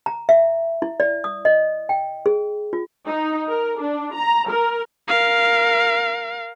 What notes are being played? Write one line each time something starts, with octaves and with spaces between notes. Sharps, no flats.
A#5
E5
E4
D5
D#6
D#5
G5
G#4
F4
D#4
A#4
D4
A#5
A#4
A#4 F5